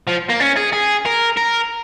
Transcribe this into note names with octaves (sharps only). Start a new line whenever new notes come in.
F3
A#3
C#4
G#4
G#4
A#4
A#4